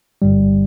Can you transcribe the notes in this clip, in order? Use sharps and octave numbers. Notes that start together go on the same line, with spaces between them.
G1 G2 G3